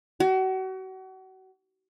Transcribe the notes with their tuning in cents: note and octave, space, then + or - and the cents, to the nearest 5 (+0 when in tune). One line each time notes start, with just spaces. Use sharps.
F#4 +35